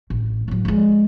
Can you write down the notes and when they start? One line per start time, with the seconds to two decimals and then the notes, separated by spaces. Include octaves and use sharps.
0.10 A1
0.48 A2 F#3
0.65 F3 G#3